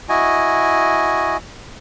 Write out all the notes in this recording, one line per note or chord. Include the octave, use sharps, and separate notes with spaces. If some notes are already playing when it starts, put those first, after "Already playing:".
E4 F#4 D#5 G#5